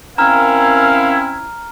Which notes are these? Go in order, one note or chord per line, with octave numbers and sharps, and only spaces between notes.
C4 C#4 E4 A#4 F5 A#5 F6